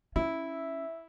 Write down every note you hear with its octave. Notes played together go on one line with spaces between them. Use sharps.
C#4 E4 E5